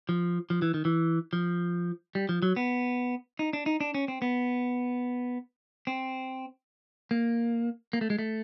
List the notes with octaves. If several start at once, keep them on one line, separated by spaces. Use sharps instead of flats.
F3
F3
E3
D#3
E3
F3
G3
F3
F#3
B3
D#4
D4
D#4
D4
C#4
C4
B3
C4
A#3
A#3
A3
G#3
A3